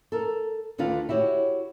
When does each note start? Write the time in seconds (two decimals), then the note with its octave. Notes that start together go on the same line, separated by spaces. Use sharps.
0.12 A4 A#4
0.78 D2 D3 D#3 F4 B4
1.09 E4 F#4 G4 C#5